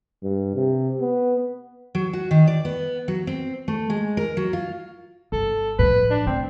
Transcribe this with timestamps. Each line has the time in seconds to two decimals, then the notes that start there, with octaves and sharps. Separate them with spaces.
0.23 G2
0.55 C3
1.00 B3
1.95 F#3
2.13 F#4
2.31 D#3
2.47 D5
2.65 B3
3.08 F#3
3.27 C4
3.68 A3
3.90 G#3
4.17 A#4
4.37 F#3
4.53 F4
5.32 G1 A4
5.79 A2 F3 B4
6.10 D4
6.27 A3 C4